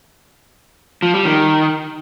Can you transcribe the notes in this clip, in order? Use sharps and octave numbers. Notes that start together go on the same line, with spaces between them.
F3
G3
D#3